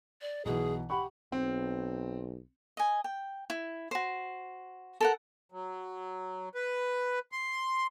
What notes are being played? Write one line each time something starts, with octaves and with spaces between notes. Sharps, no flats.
D5
B1 B2 E3 G#4
G4 F#5 B5 C#6
B1 C4
D#5 G#5
G5
E4
F#4 C5
A4 A#4 F#5
F#3
B4
C6